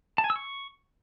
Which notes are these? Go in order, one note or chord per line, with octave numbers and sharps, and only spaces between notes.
A5
G#5
E6
C#6